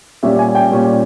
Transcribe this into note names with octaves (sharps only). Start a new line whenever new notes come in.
A#2 G3 C#4 E5
G#5
G5
A#2 G3 C#4